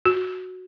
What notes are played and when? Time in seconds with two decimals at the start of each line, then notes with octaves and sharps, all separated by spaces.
0.06 F#4